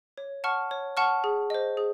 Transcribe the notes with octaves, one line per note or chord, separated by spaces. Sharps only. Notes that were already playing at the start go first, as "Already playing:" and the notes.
C#5
F#5 A5 C#6 F6
C#5
F#5 A5 C#6 F6
G#4
C5 D#5
G#4